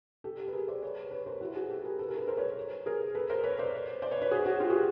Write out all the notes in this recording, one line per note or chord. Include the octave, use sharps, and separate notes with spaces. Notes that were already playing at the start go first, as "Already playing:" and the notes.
G4 A4
B4
G#4 A#4
C5 D5
B4 C#5
B4 C#5
A#4 C5
E4 F#4
F#4 G#4
G4 A4
G#4 A#4
A4 B4
G#4 A#4
A4 B4
A#4 C5
B4 C#5
G#4 A#4
A4 B4
A#4 C5
B4 C#5
C5 D5
C5 D5
B4 C#5
B4 C#5
F#4 G#4
F#4 G#4
F4 G4
F#4 G#4